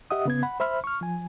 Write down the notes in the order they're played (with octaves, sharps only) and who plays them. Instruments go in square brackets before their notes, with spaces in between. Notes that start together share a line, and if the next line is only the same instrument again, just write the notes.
[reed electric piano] G4 D#5 E5 F#5 D#6
C#3 B3 G#6
F#5 B5
C5 E5 B5 F6
C#6 F6
F3 G#5